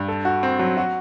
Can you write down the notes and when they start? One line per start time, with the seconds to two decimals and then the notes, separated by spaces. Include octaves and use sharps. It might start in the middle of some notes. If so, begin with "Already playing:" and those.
Already playing: G2
0.08 A4
0.25 F#4
0.43 C4
0.59 F#3
0.77 F#4